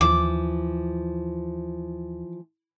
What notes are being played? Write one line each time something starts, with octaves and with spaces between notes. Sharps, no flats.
D#2 E3 F3 D6